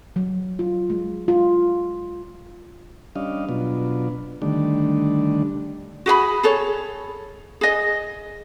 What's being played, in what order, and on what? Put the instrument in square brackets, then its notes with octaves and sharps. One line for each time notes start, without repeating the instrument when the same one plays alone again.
[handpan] F#3
F4
G#3
F4
[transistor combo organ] G3 C#4 D4 D#5 F5
B2 F#3 B3 D4 F4
D3 D#3 G3 A3 D4
[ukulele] F#4 G#4 F#5 B5
G#4 A4 C#5
G#4 D#5